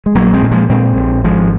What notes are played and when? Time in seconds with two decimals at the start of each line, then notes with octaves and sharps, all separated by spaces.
0.06 G#3
0.15 A#1 F#3 A#3
0.33 G#3 C4
0.42 A#2
0.51 F3 G#3
0.69 A#2 G#3 C4
0.97 A#1
1.24 G#1 F3 G#3